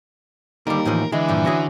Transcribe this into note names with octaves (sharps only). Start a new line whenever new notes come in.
D#2 D3 G3 A#4
A2 E3 F3
D3 E3 G#3
G2 A#2 F3
C#4 F#4 G#4